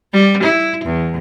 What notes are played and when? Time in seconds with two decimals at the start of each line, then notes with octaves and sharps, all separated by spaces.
0.13 G3
0.43 E4
0.84 E2